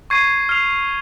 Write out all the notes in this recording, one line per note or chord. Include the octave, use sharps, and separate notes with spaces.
C#6 G#6 C7 D#7
F6 C7 F7